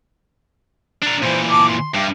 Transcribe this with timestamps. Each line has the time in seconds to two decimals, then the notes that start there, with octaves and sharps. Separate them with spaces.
1.02 D4 A#4
1.22 A#2 E3 C5
1.51 A5 D6
1.68 C6
1.94 G2 G4 E5